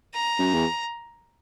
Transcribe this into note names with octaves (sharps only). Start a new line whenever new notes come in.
A#5
F#2
E2